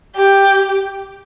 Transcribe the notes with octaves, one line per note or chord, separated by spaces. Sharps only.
G4